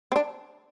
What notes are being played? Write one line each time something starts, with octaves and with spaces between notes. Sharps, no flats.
C4
D4